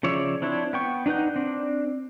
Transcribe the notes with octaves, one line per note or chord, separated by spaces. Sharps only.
C#3 F3 C#5 D5 E5
C4 D4 E4 C#5
B3 G5 C#6
D4 D#4 B4 F#5 G6
C4 D4